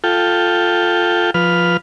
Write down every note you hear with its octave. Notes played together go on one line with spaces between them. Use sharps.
F4 A4 G5
F3 B4 F6